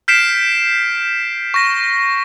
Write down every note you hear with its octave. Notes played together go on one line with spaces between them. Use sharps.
F6 G6 B6 C7 D7 E7
C#6 A#6